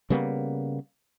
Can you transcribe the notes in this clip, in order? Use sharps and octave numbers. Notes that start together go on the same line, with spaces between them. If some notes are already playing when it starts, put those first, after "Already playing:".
C#3 G3 A#3 B3